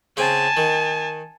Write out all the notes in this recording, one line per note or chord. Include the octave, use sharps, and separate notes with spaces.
C#3 C4 G#5 A5
D#3